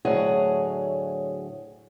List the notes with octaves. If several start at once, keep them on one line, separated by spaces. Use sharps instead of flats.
D2 A2 F#3 G#4 C#5 F#5